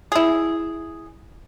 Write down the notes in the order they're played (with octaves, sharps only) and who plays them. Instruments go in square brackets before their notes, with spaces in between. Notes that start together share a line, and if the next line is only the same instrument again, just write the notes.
[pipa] E4 G#4